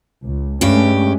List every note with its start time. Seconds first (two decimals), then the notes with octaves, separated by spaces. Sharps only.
0.23 C#2
0.61 G2 G#3 A3 C#4 G4